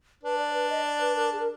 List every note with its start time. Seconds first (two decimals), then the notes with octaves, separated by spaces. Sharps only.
0.23 D4 B4
0.38 D5
0.54 B4
0.69 D#5
0.85 D5
1.01 B4
1.16 A#4
1.32 G#4
1.40 A#4